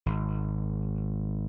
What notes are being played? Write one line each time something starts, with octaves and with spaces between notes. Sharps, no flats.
G#1